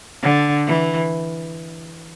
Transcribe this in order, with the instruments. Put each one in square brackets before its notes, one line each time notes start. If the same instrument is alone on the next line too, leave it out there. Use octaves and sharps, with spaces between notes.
[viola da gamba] D3
E3